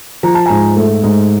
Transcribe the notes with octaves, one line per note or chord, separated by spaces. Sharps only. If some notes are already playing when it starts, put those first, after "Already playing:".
F3 A#5
A5
G#2 G#5 A#5
A3
G#2